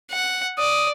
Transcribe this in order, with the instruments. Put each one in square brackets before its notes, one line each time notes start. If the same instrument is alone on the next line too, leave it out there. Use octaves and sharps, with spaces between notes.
[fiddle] F#5
[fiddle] D5 [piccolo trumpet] D#6